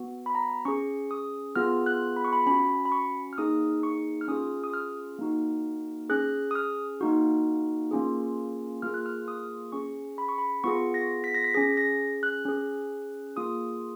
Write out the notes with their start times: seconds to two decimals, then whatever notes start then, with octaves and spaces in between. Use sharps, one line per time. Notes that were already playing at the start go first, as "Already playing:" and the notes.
Already playing: B3 F#4
0.26 B5
0.35 A#5
0.65 C#4 G#4 C#6
1.11 D#6
1.56 B3 F4 G#4 F6
1.86 F#6
2.16 B5
2.24 C#6
2.33 B5
2.47 C#4 F#4 B5
2.85 B5
2.92 C#6
3.33 F6
3.38 A#3 D#4 G#4 D#6
3.83 C#6
4.21 F6
4.28 C#4 F4 G#4 D#6
4.64 D#6
4.74 F6
5.19 A#3 D#4 F#4
6.09 C#4 G#4 F#6
6.51 D#6
6.55 F6
7.01 A#3 D#4 F#4
7.91 A#3 C#4 F4 G#4
8.82 A#3 F4 G#4 F6
8.94 F#6
9.06 F6
9.28 D#6
9.72 C#4 G#4 C#6
10.18 B5
10.29 C#6
10.38 B5
10.64 B3 F4 G#4 C#6
10.94 A#6
11.24 B6
11.34 A#6
11.44 B6
11.54 C#4 G#4 A#6
11.77 A#6
12.23 F#6
12.45 C#4 G#4
13.36 A#3 F4 G#4 D#6